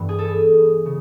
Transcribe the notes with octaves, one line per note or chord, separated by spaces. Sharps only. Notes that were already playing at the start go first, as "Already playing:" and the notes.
Already playing: G2 E3 B3
G#4
A4
G#4
C#3